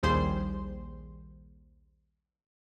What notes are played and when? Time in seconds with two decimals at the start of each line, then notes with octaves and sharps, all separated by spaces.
0.03 A#1 D#2 G3 G#4 C5 C6